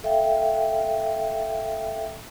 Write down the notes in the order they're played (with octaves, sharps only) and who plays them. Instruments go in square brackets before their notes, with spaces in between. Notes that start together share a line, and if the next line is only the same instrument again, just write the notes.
[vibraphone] A4 E5 F5 G5